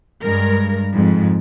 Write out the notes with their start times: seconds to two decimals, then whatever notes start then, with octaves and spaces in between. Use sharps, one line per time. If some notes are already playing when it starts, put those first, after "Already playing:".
0.22 G2 G#3 A#4
0.93 F2 G#2